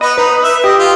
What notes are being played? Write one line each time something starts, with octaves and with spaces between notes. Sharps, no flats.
B3 B4 D#5
D#4 B4
E5
G4 D#5
F4